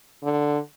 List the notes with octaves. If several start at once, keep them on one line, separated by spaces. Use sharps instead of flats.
D3